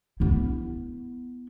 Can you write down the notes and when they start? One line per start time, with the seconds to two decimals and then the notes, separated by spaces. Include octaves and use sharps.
0.20 B3 E4